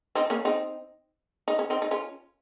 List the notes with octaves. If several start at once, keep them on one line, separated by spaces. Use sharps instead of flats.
C4 D#4
A#3 C#4
C4 D#4
D#4
C#4
C4 D#4
D#4
C#4 F4